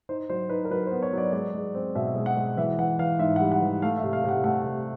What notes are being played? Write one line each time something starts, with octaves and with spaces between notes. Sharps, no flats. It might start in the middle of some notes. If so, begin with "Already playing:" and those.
D#4 C5
F#3 C5
D#4 B4
A#4
F#3 B4
C5
B3
C#5
F#3 D5
G#3 D5
G#3
C4
B2 E5
G#3
F#5
G#3
E3 E5
E3 F#5
E3 F5
G#2 E5
F#5
G3
F#5
E3
A3 F5
E5
C3
F5
C3 F#5
A3 F#5
C3